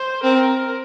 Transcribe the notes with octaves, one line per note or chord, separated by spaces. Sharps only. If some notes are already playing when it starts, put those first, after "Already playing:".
Already playing: C5
C4 A#4